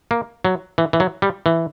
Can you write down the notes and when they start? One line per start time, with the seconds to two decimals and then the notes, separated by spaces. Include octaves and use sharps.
0.11 A#3
0.45 F#3
0.78 E3
0.93 E3
1.00 F#3
1.22 G3
1.46 E3